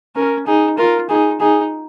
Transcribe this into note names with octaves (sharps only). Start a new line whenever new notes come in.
C#4 A#4
D#4 G#4
F4 A#4
D#4 G#4
D#4 G#4